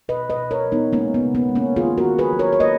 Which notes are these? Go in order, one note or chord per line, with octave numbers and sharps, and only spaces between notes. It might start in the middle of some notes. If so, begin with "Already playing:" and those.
B2 B4 D#5
B4 D#5
B2
A#4 C#5
F#3
B3 D#4
G#3 A#3 C#4
B3
C#3
B3
G#3
A#3 C#4
D#3 F4 G#4
F#4 A#4
D#3
G#4 B4
F#3
A#4 C#5
C#5
A#3 B4 D#5